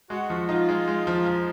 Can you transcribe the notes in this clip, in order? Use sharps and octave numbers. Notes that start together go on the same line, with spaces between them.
G#3 F#4
F3
D#4 F4
G#3
G#3
F3
F3